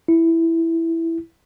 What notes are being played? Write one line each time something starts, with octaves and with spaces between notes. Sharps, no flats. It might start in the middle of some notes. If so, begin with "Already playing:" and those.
E4